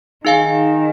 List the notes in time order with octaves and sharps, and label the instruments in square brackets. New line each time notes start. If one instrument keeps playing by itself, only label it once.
[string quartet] D#3 [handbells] D#4 G#4 F5 G#5